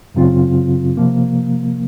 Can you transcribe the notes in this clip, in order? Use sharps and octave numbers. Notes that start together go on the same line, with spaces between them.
F#2 C#3 F#3 C4 F4
C3 F3 A#3